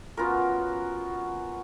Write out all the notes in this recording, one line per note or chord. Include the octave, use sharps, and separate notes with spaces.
B3 C#4 F4 F#4 A#4